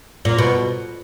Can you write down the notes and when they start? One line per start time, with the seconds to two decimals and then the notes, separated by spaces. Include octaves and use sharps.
0.25 A#2
0.38 B2